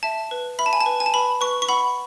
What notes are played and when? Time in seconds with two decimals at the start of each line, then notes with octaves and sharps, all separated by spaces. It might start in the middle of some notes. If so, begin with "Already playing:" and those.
0.03 E5 A5
0.31 B4
0.59 E5 B5
0.66 A5
0.73 G#5
0.81 A5
0.86 B4
1.00 G#5
1.06 A5
1.14 B4 B5
1.41 B4 C#6
1.62 C#6
1.69 F#5 B5